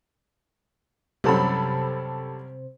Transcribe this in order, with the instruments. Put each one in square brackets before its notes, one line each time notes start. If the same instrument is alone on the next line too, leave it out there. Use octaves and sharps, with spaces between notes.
[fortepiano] C2 F#2 [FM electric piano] C3 C5 [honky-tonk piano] G4 A4 B5